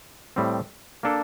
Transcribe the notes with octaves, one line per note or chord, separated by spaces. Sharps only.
A2 G3 C4
A#3 D4 A4